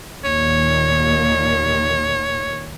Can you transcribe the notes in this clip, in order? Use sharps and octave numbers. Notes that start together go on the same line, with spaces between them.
D#2 A#2 D#3 C#5